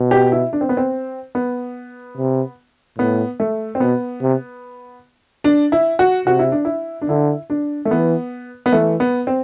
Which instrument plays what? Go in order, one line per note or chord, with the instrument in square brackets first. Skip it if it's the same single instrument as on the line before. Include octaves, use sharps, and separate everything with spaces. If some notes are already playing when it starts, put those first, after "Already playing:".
Already playing: [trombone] B2
[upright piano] G4
E4
D4
C4
B3
C4
B3
[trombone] C3
[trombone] A2 [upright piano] B3
[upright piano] A3
C4
[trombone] B2 [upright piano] B3
[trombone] C3
[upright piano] D4
E4
F#4
[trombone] C3 [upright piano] F#4
[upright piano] E4
D4
E4
D4
[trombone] D3 [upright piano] E4
[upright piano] D4
A3
[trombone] E3 [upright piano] B3
[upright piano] B3
[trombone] E3 [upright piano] A3
[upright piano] B3
C4